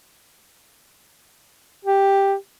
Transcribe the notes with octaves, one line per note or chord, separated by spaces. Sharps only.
G4